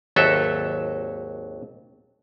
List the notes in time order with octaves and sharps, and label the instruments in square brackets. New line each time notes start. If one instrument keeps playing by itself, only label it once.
[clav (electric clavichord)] G#1 D#2 F#3 A4 E5